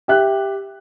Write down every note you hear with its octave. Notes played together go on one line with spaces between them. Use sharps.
G4 E5 F#6